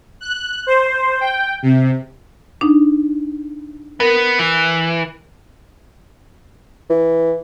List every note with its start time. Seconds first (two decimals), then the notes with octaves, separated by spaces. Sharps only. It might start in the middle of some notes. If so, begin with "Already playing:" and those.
0.21 F#6
0.67 C5
1.21 G5
1.63 C3
2.61 D4 D#4
4.00 B3 A#4
4.39 E3
6.90 E3